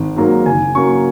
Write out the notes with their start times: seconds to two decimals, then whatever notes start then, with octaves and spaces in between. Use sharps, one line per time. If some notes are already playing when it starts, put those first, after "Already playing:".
Already playing: G#1
0.16 G#2 F#3 A#3
0.46 F#1 G#5
0.75 F#2 F#3 A#3 C#6